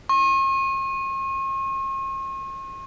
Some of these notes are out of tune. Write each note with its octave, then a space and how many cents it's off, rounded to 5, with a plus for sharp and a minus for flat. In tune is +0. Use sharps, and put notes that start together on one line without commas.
C#6 -45